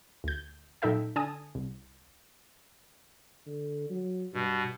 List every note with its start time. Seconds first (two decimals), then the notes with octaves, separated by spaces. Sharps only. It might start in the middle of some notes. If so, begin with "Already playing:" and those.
0.24 D2 G6
0.82 F#2 A#2 D#4 A4 E5 G5
1.16 D3 G#5 A5 D#6
1.55 C2
3.47 D3
3.90 F#3
4.34 G2 B2